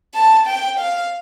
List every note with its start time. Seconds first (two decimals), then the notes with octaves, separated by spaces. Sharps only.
0.14 A5
0.47 G5
0.79 F5